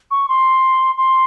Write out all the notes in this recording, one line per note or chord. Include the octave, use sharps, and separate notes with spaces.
C#6
C6
C6